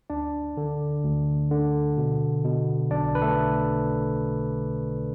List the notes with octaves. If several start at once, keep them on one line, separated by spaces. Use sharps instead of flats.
D2 D4 D5
D3
D2
D3
B2
B2
B1 D4 D5
B4
A3 A4